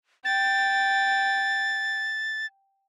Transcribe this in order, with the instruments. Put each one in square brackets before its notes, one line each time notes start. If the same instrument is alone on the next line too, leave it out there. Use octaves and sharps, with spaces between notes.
[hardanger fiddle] G5 [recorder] A6